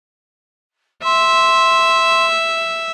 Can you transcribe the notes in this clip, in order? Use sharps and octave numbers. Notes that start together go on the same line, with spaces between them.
E5 C6